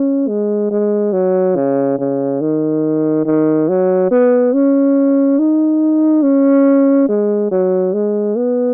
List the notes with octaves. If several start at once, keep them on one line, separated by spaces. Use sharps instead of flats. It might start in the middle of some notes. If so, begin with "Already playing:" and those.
Already playing: C#4
G#3
G#3
F#3
C#3
C#3
D#3
D#3
F#3
B3
C#4
D#4
C#4
G#3
F#3
G#3
B3